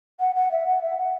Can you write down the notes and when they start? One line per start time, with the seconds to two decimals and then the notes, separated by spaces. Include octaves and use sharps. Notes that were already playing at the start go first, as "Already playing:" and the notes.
0.20 F#5
0.35 F#5
0.51 E5
0.66 F#5
0.82 E5
0.97 F#5